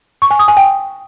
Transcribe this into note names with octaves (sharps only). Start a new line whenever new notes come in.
C#6
G#5
D#6
G#5
G5